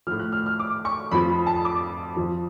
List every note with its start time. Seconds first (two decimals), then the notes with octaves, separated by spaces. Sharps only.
0.07 F3 F6
0.11 A2
0.19 F#6
0.32 F6
0.46 F6
0.59 D6
0.85 C#6
1.11 F2 F3 B5
1.29 B5
1.46 A5
1.65 D6
2.16 F2 F3